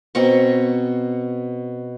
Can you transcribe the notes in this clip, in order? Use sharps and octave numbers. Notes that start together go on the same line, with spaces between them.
B2 C4 A#5 C#6